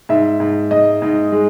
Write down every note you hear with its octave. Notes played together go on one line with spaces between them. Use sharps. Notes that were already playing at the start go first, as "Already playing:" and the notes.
G#2 E5
G#2
G#2 D#5
G#2
G#3